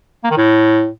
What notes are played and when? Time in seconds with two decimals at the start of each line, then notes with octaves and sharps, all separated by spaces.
0.24 A#3
0.30 D#3
0.37 A2